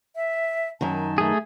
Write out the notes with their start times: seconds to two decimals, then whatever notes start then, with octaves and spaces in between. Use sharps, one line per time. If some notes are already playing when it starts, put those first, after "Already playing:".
0.16 E5
0.81 F#2 D#3 A5
1.18 A3 G#4